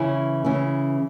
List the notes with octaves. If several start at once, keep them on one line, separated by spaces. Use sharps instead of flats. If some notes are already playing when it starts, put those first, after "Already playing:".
Already playing: C#3 E3 C#4 E4
C#3 E3 C#4 E4